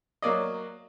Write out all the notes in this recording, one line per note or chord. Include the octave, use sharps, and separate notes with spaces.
F#3 A#3 D5 D#5